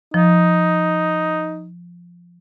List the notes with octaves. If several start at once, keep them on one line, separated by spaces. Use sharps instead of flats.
F3 D#4